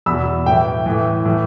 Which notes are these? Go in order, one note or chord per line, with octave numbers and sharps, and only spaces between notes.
E2 B2 B5 E6
A2 E3 G5
A2 E3
A2 E3